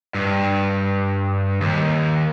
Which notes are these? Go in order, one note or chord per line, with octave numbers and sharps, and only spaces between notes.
G2
D#2